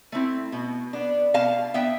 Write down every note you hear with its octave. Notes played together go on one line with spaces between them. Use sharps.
A3 C4 E4
B2
B3 D4
B2 F5 A5
B3 D4 E5 G5